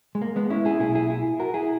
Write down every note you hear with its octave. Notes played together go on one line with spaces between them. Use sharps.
G#3
A#3
G#3 B3
C#4 E4
E4 G#4
B1 A#2 E4 G#4
E4 G#4
E4 G#4
F#4 A#4
E4 G#4